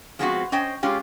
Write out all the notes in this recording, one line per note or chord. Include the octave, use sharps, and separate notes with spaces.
F3 G#3 B3 C4 D4 F#4
C#4 C5 D#5 G5
G#3 C#4 F4 G4